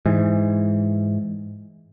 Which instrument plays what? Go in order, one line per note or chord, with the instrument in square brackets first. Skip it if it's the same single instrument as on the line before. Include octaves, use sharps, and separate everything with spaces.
[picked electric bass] G#2 E3